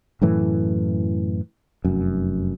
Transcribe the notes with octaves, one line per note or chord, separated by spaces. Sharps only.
F#2 A2 E3 A3
F1 F#2